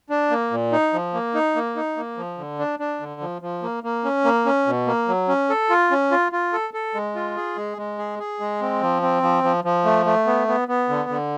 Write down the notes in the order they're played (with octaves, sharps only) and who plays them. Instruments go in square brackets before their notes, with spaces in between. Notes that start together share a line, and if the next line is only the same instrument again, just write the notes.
[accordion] D4
A#3
A#2
D#4
F3
A#3
D#4
A#3
D#4
A#3
F3
D3
D4
D4
D3
F3
F3
A#3
A#3
C#4
A#3
C#4
B2
A#3
F#3
C#4
A4
F4
C#4
F4
F4
A4
A4
G#3
F4
G#4
G#3
G#3
G#4
G#4
G#3
C4
F3
C4
F3
F3
F3
A3
A3
B3
B3
B3
D3
D3